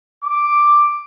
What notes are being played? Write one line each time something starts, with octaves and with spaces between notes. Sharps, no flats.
D6